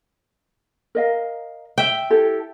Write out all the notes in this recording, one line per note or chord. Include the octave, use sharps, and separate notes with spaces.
A#4 D#5 F5
E5 G5
E4 G4 A4